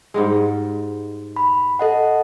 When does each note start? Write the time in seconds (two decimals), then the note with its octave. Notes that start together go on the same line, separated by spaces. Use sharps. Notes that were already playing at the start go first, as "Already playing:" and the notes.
0.14 G#2 G3 G#3
1.36 B5
1.79 A4 D#5 F#5